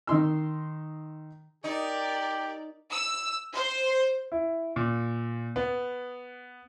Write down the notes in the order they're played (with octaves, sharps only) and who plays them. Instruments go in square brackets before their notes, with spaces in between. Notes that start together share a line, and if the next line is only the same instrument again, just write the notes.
[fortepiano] D#3 D#4 C6 E6
[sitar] D#4 [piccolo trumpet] G4 [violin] A#4 D5
[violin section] E6
C5
[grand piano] E4
A#2
B3